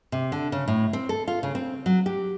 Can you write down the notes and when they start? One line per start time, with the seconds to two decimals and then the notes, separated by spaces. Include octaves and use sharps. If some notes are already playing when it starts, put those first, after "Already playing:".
0.12 C3
0.32 D3
0.52 C#3
0.68 A2
0.93 C4
1.09 A4
1.28 F4
1.43 C#3
1.55 C4
1.86 F#3
2.06 G4